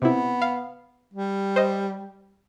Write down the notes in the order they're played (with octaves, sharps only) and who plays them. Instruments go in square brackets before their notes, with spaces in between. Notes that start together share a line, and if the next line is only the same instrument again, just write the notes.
[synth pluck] C3 E4 [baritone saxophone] B3
[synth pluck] F5
[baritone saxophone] G3
[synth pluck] C5 D#5